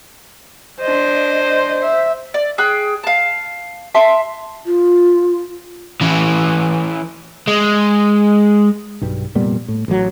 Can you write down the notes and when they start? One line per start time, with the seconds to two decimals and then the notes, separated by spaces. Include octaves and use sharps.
0.81 D4 C5 D#5
1.81 E5
2.34 D5
2.58 G#4 G5 F#6
3.03 F5 A5
3.95 E5 A5 C6
4.66 F4
6.01 E3 C#4
7.47 G#3
9.01 B1 G2 G3
9.35 F1 A#2 G3 B3
9.68 A2
9.88 A1 F#3